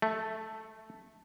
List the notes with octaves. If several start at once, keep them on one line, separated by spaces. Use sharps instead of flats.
A3